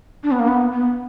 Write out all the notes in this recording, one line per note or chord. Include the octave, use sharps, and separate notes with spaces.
D4
B3
A#3
B3
B3